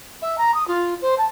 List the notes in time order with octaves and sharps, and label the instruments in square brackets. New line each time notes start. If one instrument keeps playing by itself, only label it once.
[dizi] E5
A#5
D#6
F4
C5
A5